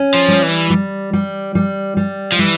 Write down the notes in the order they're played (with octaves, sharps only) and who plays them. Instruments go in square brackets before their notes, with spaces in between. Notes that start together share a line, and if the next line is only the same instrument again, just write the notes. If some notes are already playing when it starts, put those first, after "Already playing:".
Already playing: [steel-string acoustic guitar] C#4
[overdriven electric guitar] F3
[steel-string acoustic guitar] G3
[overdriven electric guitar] E3
[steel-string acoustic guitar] G3
G3
G3
G3
[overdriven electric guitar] F3
[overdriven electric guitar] E3 [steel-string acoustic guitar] G3